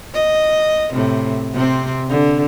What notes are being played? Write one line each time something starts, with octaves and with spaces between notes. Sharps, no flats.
D#5
A2 C3
C3 C4
D3